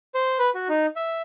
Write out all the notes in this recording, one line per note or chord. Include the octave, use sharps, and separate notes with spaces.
C5
B4
F#4
D#4
E5